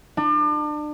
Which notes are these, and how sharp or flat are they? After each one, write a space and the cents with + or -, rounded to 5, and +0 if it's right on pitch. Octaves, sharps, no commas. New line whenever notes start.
D4 +35